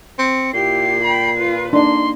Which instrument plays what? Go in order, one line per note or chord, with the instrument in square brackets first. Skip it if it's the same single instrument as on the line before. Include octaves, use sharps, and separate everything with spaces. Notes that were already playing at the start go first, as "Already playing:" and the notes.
[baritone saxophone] C4 [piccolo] C#7
[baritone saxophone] A#2 [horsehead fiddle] E4 G4 [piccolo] C7
[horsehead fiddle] G5 B5
F4 B4
[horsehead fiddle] A#3 [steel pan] D4 D#4 [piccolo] C6